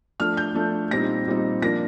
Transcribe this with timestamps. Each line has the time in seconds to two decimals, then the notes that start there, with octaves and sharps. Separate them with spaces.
0.20 F3 A3 D4 F6
0.37 G6
0.55 F3 A3 D4
0.91 A#2 G3 C4 D#4 A#6
1.27 A#2 G3 C4 D#4
1.62 F3 A#3 D4 A#6